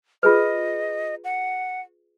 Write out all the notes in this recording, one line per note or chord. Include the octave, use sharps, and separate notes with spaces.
F4 G#4 B4 D#5
F#5